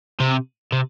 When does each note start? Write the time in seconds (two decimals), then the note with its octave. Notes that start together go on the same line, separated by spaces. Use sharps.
0.20 C3
0.72 C3